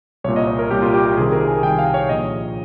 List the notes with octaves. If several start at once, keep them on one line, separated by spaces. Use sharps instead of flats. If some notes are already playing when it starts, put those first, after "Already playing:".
C2 A#2 C#5
D#5
C#5
A#4
C2 A#2 G4
F4
G4
G4
C2 C3 D#3 G#4
A#4
G#5
C2 C3 D#3 G5
F5
C#5
A#1 A#2 D#5